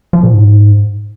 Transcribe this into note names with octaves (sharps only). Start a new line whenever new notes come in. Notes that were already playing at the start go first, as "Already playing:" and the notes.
F3
A#2
G#2